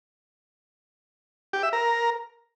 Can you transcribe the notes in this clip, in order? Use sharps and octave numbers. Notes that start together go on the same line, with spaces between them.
G4
E5
A#4